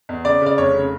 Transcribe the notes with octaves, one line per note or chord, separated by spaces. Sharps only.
E2
C#3 D5
C#3 D5
F1 C#5
C#3